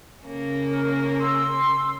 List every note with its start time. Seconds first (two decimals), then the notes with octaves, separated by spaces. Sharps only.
0.24 C#3 A#3 C#4
0.68 A#4
1.19 C6 E6